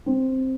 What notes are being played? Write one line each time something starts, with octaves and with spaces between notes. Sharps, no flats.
C4